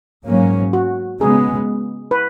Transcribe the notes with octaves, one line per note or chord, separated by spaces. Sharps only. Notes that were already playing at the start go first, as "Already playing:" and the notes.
G#2 F#3 A#3 C#4
F#4
C#3 G#3 B3 G#4
B4